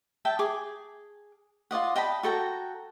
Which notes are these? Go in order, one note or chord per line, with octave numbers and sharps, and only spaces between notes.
E5 G5 A5
G#4 D6
F4 D5 D#5 F#5
D#5 G5 A5 B5
F#4 A4 G5 A#5